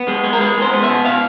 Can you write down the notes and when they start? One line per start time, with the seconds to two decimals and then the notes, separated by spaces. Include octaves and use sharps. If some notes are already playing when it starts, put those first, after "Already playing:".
Already playing: B3
0.08 G#3
0.24 G#3
0.33 A#4
0.41 G#3 B4
0.56 E2
0.62 C5
0.73 B3
0.83 E5
0.89 B2
1.05 B2 F5